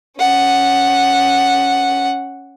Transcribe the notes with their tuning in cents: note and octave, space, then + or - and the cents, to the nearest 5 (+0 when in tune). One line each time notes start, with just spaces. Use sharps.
C#4 +0 F#5 +0